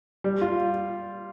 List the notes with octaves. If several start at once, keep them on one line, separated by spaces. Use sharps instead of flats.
G3
F4